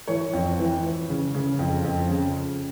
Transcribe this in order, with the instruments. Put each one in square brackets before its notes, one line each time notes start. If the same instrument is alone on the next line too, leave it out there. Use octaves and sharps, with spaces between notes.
[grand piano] E3 C#5
F2
E3
E3
C#3
C#3
F2
F2
C#3